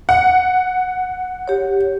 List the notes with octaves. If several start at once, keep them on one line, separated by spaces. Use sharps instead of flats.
F#5
G4 C#5